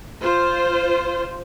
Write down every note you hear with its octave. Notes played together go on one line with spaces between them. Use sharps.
F4 C5